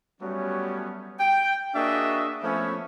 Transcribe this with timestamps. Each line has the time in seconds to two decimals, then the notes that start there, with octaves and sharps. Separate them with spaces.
0.21 F#3 G3 A3 B3 C#4
1.20 G5
1.75 A#3 D4 F#4 G#4 D#5 E5
2.44 F3 A3 B3 C#4